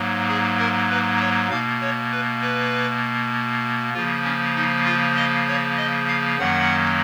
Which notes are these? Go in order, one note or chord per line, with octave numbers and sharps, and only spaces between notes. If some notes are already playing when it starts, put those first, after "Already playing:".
Already playing: G#2 F#3 A#3
G#4
A#4
B4
C#5
B2 A#3 F5
C#5
B4
B4
C#3 F3 A#3 F4
C#4
D#4
F4
D#5
C#5
D#5
F5
F#2 D#3 F#3 A#3 F#5